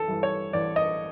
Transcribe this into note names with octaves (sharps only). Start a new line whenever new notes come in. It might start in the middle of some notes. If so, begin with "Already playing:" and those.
Already playing: A1 A4
G2 E3
C#5
A1 D5
D#5